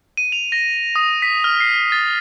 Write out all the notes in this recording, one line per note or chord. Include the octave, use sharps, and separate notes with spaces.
D#7
F7
A#6
D#6
B6
F6
C7
A6